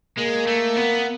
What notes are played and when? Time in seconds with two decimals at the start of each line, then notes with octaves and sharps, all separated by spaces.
0.18 G#3 A#3
0.47 A3
0.77 B3